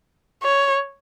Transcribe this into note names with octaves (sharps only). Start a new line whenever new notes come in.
C#5